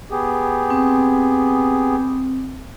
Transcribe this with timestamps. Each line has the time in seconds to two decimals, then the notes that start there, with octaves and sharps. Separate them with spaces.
0.11 B3 G4 G#4
0.70 C4